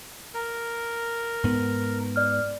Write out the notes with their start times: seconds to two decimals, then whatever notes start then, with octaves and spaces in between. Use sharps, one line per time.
0.34 A#4
1.44 G#2 B3
2.16 D5 F6